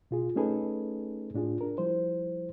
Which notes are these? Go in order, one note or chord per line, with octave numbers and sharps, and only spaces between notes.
B2 F4 G#4
A3 C#4 D#4 G#4 A4 B4
A2 D4 F4 G#4
D4 A#4
F3 G3 E4 C5